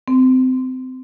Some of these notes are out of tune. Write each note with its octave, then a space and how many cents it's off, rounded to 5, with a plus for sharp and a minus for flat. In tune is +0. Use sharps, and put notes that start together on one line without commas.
C4 -25